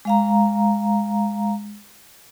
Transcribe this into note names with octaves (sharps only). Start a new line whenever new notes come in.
G#3 F5 A#5